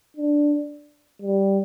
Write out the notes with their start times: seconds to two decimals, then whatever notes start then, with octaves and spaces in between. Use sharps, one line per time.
0.17 D4
1.22 G3